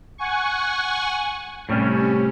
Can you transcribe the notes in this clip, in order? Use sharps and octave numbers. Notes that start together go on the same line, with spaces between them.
F#5 G#5 C#6
A2 C3 G3 C#4